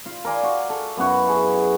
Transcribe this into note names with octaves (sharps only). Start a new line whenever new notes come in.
F4 F5
A#4 D5 G#5 C6
F#4
A4
F#2 B3 E4 F#4
G#4